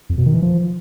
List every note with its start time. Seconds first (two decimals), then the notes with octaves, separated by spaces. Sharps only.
0.10 F2
0.18 B2
0.26 D#3
0.34 E3
0.42 F3